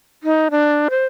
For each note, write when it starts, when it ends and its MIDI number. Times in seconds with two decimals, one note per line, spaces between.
0.23 0.48 63
0.51 0.88 62
0.90 1.06 72